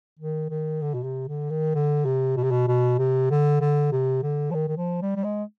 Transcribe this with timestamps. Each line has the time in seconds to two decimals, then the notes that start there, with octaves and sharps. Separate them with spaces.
0.19 D#3
0.50 D#3
0.81 D3
0.93 B2
1.03 C3
1.28 D3
1.50 D#3
1.75 D3
2.05 C3
2.37 B2
2.43 C3
2.51 B2
2.68 B2
2.98 C3
3.30 D3
3.61 D3
3.92 C3
4.23 D3
4.50 F3
4.54 D#3
4.68 D#3
4.77 F3
5.02 G3
5.16 G3
5.24 G#3